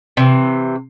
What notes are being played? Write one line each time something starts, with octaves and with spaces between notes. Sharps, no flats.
C3 E3